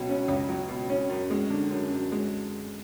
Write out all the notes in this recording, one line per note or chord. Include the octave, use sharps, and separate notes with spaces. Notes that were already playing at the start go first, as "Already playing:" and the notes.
Already playing: C#2 B2 F#3
C#4
C#2
F#3
B2
C#4
F#2
G#3
D3
F#2
F#2
G#3